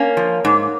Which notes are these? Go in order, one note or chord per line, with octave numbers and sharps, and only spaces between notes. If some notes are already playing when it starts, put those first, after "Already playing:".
Already playing: A#3 C#4
F3
G#2